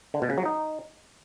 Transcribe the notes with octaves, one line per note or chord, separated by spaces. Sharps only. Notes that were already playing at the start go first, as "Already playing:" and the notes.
D3
B2
C#3
F#3
D#4